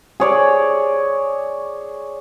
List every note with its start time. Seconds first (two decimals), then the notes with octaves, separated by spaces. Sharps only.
0.20 G#4 C#5 D5